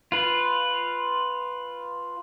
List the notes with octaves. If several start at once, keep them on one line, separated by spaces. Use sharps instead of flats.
F4 B4